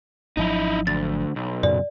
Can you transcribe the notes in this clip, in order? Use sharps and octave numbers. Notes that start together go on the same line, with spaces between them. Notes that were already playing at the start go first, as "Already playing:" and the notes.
G#1 F3 F#3 D#4 E4
D2 A6
B1
F#2 A#2 C#3 D5